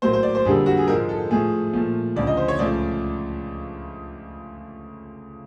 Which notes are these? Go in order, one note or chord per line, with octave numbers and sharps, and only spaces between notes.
A2 F#3 A#3 C5
C5
D5
C5
F2 D3 G3 A#3 G#4
F#4
G#4
G#2 F3 G#3 A#4
A4
A2 F3 A3 G#4
A#2 F3 A3
D2 C#3 F3 D5
D#5
C5
C#5
C#2 C#3 F3 A3 D5